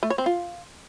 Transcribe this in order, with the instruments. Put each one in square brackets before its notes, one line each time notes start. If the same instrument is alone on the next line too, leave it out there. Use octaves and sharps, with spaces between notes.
[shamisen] A3
C#5
C4
F4